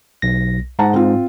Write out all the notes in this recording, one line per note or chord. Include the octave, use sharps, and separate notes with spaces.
B1 A#6
G#2 F#5 A5 A#5
C4 F4